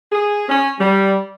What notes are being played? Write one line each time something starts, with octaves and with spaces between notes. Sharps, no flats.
G#4
C#4
G3